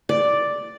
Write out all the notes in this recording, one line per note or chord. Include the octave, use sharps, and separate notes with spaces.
D5